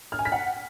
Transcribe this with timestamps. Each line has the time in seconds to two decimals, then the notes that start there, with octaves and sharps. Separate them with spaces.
0.12 F6
0.19 G#5
0.25 B6
0.32 F#5